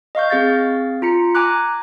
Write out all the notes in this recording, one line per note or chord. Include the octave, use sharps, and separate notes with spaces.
D#5 F5 C#6 G6
C4 G#4 F5 A6
F4 A#5 C#7
G#5 A#5 D6 F#6